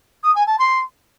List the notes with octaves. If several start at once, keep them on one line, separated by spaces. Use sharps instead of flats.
D#6
G#5
A5
C6